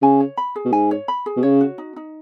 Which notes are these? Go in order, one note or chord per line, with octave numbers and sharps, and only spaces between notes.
C#3 G#5
C#5
B5
G#4
B2
G#2 G#5
C#5
B5
G#4
B2
C#3 C#5
F#4
D#4
D#4